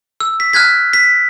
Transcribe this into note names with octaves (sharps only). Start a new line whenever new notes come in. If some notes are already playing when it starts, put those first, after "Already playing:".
E6
B6
F6 F#6 G#6 B6
B6